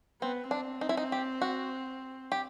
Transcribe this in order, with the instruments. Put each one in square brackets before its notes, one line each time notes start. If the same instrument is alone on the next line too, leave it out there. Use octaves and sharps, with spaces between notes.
[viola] B3 [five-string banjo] C4
[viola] C4 [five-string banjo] D4
[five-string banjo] D#4
E4
D#4
G4
F#4
G4